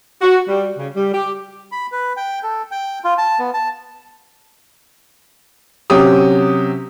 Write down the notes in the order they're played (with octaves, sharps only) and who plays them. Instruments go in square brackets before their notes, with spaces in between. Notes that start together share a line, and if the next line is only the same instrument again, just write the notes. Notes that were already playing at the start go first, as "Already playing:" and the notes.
[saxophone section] F#4
G3
C#3
G3
G4
[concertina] B5
B4
G5
A4
G5
F4
A5
B3
A5
[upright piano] C3 F#3 C#4 G4 D#6